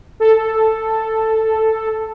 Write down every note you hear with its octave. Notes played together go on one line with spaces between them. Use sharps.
A4